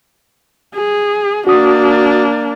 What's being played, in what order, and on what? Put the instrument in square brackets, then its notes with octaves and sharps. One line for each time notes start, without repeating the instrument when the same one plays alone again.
[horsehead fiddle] G#4
[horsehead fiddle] A#3 D4 [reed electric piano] F#4 D#6